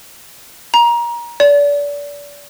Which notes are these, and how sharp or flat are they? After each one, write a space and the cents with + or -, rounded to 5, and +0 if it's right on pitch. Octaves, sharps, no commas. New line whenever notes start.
A#5 +25
D5 -30